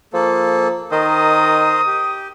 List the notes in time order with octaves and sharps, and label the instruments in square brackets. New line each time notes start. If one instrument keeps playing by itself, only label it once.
[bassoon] F3 [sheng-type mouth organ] A#3 A4
[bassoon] D#3 [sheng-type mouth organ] A#4 C5 D#5 [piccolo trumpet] D#6
[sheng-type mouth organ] G4